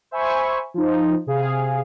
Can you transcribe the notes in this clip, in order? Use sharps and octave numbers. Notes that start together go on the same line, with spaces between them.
C5 E5 G#5 B5 C#6
F3 D#4
C3 G#4 F5